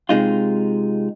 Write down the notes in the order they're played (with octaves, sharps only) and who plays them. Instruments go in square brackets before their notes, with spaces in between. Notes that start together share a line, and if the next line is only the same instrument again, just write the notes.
[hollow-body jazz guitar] C3 G#3 D#4 F4